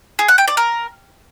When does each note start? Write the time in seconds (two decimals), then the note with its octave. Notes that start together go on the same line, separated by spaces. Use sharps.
0.19 G#4
0.28 F#5
0.38 G5
0.48 D5
0.57 A#4